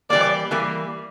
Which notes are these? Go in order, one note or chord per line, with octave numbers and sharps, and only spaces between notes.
E3 G3 A#3 D5
E3 G3 A#3